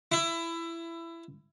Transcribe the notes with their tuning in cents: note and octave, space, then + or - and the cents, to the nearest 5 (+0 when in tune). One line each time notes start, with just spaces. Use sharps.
E4 +20